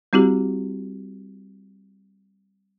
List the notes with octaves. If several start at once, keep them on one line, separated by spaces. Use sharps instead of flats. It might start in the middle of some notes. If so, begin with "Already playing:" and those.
G3 C4 E4 F#4 G4